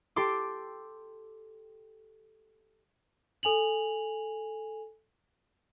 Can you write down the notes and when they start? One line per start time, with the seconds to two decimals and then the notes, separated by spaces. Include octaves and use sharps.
0.16 G4 A4 C6 D6
3.43 A4 G#5 F7 F#7